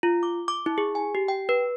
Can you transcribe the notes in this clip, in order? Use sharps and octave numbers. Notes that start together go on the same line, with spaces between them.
F4
D6
D6
E4
G#4
G#5
G4
G5
B4